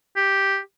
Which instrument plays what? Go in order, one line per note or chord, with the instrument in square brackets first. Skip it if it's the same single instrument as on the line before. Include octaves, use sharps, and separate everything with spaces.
[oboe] G4